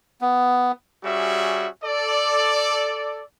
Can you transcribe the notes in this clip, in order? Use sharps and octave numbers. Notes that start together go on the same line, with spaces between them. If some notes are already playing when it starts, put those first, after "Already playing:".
B3
G3 C#4 F#4 G#4 E5
A4 D5